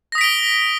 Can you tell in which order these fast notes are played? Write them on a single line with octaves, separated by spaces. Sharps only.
A#6 D#6 B6 D7 G7